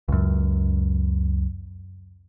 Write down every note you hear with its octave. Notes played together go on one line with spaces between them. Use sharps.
C#2 F#2